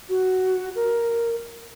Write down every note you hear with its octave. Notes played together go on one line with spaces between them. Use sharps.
F#4
A#4